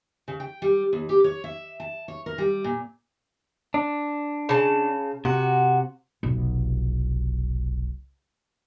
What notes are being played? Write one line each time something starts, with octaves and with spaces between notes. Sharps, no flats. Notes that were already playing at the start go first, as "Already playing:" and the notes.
C#3
G5
G3
D#2
G4
C#5
E5
A5
C#5
A#4
G3
A#2
D4
C#3 A5
C3 F#4
F1 B1